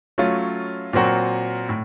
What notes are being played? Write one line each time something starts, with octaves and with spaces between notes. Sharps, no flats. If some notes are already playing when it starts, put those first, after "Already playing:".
F#3 A3 C#4 F4
A#2 F#3 C4 F#4 A#4
A2